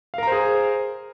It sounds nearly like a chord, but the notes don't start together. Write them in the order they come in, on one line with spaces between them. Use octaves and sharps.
F5 A#4 A#5 C5 G#4